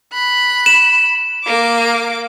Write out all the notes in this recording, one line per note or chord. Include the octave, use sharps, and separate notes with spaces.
B5 F#6
E7
A#3 D6